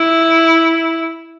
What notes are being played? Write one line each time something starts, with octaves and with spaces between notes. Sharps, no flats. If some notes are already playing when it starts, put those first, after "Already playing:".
Already playing: E4